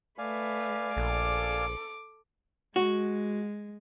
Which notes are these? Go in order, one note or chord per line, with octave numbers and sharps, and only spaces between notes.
A3 B4 D5 F5 G#5
A#1 A4 D6
G#3 F#4